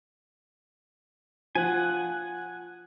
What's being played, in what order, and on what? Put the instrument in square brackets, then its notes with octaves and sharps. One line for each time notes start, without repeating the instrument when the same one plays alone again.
[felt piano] F3 [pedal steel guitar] F#5 G#5